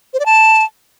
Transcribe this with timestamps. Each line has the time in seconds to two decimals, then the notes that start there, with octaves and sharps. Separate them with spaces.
0.14 C5
0.20 D5
0.26 A5